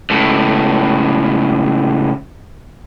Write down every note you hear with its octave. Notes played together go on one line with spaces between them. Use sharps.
C#2 A2